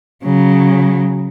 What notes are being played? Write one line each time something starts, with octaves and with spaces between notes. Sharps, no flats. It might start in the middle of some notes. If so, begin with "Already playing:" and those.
C#3 F#3